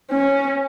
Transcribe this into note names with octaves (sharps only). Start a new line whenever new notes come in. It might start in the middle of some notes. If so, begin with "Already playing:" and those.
C#4